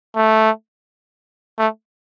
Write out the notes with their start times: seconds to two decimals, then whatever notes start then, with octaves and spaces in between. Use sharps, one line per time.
0.16 A3
1.59 A3